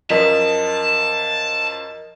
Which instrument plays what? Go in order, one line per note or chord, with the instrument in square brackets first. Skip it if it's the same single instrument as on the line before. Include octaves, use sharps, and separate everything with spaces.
[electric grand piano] F#2 F3 [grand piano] A#4 D#5 B6 [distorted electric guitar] A5